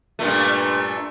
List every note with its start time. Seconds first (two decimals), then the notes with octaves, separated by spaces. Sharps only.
0.19 G2 A#2 A3